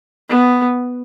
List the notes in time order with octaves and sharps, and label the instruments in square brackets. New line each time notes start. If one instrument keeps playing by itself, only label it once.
[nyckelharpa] B3